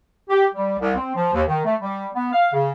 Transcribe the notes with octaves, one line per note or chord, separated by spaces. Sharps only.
G4
G3
C2
C4
F3
D#2
D#3
A3
G3
B3
F5
C#3